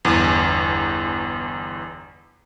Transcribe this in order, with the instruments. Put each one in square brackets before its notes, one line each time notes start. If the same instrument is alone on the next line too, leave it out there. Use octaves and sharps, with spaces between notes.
[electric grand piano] G1 E2